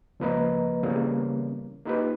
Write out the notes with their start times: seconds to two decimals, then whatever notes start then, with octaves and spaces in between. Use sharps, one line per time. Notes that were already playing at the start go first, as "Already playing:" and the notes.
0.20 C#2 F3 A#3 B4 D#5 A#5
0.83 C#3 E3 G3 A#3 B3 C#4
1.85 A#3 D#4 F4 G4 B4